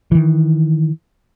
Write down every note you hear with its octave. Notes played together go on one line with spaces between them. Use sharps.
D#3 E3